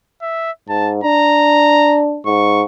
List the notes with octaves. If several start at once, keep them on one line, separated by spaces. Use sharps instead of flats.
E5
G#2 A5
D4 A#5
G#2 C#6